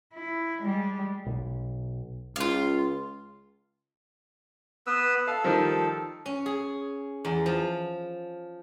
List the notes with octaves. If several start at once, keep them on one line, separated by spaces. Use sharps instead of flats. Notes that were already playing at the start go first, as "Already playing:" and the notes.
E4
G3 G#3
B1
C#2 F4 F5
B3 B4 E6
A4 F5
D#3 F3 G3
C#4
G#4
E2
F3